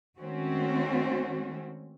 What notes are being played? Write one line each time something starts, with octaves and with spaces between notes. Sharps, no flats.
D#3 G#3 A3 C4 C#4 F#4